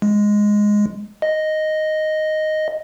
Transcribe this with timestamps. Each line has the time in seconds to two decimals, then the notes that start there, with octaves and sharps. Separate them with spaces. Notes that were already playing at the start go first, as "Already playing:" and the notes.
0.02 G#3
1.22 D#5